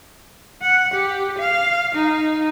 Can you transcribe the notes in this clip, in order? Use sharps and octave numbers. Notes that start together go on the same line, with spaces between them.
F#5
G4
F5
D#4